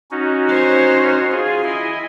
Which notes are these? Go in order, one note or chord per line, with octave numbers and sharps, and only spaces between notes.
C#4 D#4 F#4
C5 C#5
F4 G#4 G#5
E4 D#5